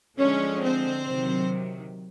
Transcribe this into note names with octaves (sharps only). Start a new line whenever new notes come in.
D3 F3 G#3 C#4 C#5
C4 C5
C3 D#3 F#3